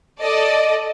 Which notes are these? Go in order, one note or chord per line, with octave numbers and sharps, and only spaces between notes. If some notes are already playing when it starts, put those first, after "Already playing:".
A4 D5 D#5